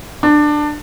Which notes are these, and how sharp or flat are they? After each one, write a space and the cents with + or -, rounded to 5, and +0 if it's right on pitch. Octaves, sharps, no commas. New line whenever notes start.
D4 +15